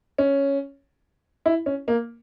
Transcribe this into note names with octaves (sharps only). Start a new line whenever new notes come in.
C#4
E4
C#4
A#3